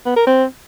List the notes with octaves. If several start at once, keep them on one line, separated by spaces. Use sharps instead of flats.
B3
A#4
C4